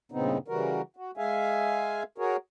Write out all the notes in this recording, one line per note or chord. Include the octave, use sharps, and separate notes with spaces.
G2 A#2 C#3 B3 C4 D#4
C#3 E3 G3 F#4 A#4
F#4
G#3 G#4 E5 F5 G#5
F#4 G#4 A#4 C#5